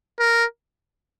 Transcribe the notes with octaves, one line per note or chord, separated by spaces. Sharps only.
A#4